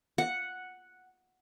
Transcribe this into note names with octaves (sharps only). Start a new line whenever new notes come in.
F#5